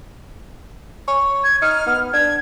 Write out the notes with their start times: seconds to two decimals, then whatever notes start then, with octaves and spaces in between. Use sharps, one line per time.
1.08 C#5
1.44 G#6
1.62 D#4 F6
1.86 B3
2.13 D4 G#6